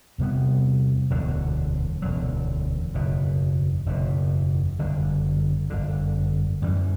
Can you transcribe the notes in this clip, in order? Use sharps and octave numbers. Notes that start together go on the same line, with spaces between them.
E2 C3 G3 B3
E1 D2 D3 F#3
E1 D2 D3 F#3
F#1 E2 B2
F#1 E2 B2
G1 F#2 D3
G1 F#2 D3
F#2 E3 G3